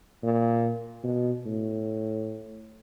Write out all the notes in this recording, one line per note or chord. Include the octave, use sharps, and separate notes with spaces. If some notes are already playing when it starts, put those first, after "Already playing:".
A#2
B2
A2